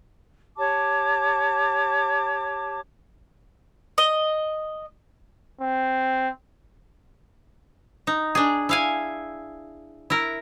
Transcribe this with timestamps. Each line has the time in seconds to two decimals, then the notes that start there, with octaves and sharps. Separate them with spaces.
0.57 G4 C#5 A5 D6
3.98 D#5
5.61 C4
8.07 D#4
8.35 D4 G#4
8.69 E4 F5 G#5
10.10 E4 A#4